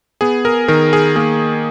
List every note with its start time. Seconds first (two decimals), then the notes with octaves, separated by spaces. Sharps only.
0.21 B3 G#4
0.45 A#4
0.68 D#3 A#4
0.93 G#4
1.16 A#3 G#4